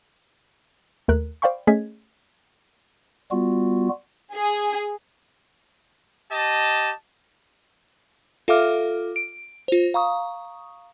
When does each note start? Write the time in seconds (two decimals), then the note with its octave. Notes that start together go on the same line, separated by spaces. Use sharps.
1.08 D#2 A3 A#4 F#6
1.42 C5 D5 F5 G5 B5 C#6
1.67 A3 C#4 G#4 D#5 G#6 B6
3.31 G3 B3 F4 F#4
4.34 G#4
6.31 G4 D#5 A5
8.48 F4 A4 E5 F5 D6 F6
9.16 D7
9.68 F4 C5
9.94 F5 A#5 C#6 D#6